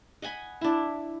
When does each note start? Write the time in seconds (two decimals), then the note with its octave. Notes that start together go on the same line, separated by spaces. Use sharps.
0.22 D#5 F#5 G#5 B5
0.61 D4 E4